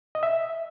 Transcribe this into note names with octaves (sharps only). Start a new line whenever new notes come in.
D#5
E5